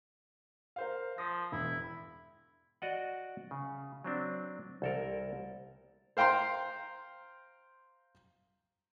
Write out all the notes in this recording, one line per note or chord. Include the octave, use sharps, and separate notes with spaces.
A#4 C5 F5
F3 D#6 A#6
E1 E4
F#4 D5 D#5 F#5
C#3
F#3 C4 D4
C2 A4 A#4
C5 F5 G5 A#5 C6